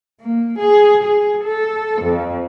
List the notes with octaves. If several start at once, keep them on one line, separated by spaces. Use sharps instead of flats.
A#3
G#4
G#4
A4
F2